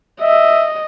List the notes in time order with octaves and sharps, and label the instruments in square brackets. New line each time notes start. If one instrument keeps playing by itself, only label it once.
[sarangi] D#5 [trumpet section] E5